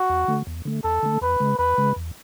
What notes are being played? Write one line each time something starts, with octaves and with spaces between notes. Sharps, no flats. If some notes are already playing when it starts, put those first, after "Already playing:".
Already playing: F#4
E2
D3 A3
E2
D3 A3
E2 A4
D3 A3
E2 B4
C#3 G#3
E2 B4
C#3 G#3
E2